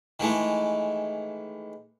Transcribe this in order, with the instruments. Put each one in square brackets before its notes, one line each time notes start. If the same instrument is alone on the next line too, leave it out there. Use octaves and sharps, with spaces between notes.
[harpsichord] D#3 E3 G#3 A3